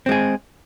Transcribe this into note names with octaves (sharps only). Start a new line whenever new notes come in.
G#3 C4 G#4